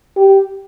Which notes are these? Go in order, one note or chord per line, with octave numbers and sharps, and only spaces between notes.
G4